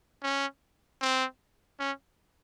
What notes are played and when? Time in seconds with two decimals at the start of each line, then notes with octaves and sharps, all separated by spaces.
0.23 C#4
1.01 C4
1.80 C#4